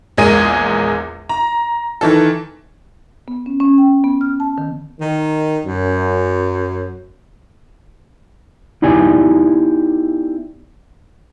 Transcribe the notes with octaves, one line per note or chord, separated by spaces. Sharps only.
A#1 E2 G#3 G#4 A#4 D#7
A#5
D#3 E3 A4
B3
C#4
C#4
G5
B3
F6
A5
D#3
D#3
F#2
B3 D#4 E4 G4 D5 G#5